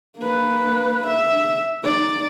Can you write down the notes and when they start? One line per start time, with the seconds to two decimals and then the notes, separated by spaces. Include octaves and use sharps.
0.18 A#3 B4
1.07 E5
1.84 D#4 D5